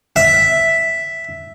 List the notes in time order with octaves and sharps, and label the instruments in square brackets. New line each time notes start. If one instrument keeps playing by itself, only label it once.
[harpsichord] E5